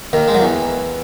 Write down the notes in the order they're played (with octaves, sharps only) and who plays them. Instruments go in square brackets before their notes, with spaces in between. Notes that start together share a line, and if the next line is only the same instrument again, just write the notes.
[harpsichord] D#2 D#3
G#3
F#3
E2 E3